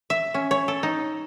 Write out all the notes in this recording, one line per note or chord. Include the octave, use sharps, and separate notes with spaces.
E5
C#4
C#5
A4
D#4